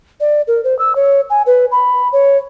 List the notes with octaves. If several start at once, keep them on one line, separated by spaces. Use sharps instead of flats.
D5
A#4
C5
E6
C#5
G#5
B4
B5
C#5